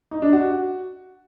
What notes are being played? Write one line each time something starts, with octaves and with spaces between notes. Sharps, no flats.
D#4
D4
F#4